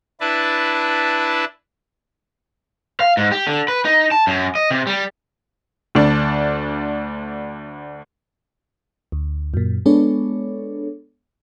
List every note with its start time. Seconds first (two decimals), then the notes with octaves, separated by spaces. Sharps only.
0.20 D4 E4 B4 A5
3.00 F5
3.17 G#2
3.32 G4
3.47 D3
3.68 B4
3.85 D#4
4.12 A5
4.27 F#2
4.55 D#5
4.71 C3
4.87 G3
5.95 D2 D4
9.12 D2
9.54 F#2 A#2
9.86 G#3 B3 D4 A4 C#5